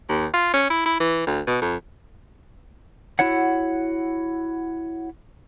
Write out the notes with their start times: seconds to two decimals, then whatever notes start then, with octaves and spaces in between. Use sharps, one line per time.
0.09 D#2
0.33 F4
0.54 C#4
0.70 E4
0.86 E4
1.00 E3
1.27 D2
1.47 B2
1.61 F2
3.19 E4 F#4 C#5 F#5